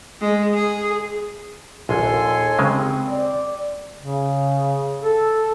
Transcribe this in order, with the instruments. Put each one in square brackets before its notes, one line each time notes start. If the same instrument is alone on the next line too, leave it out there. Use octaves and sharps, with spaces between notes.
[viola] G#3
G#4
[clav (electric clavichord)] A#1 [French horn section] D#2 [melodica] A4 G#5 C6
[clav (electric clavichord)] C#3 G#3 [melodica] C4
[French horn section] D5
[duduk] C#3
A4